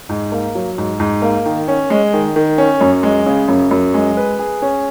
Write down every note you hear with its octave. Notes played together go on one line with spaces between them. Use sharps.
G#2
A#3
F#3
G#2
G#2
A#3
D#3
C#4
G#3
D#3
D#3
C#4
F#2
G#3
C#3
F#2
F#2
G#3
B4
G#4
C#4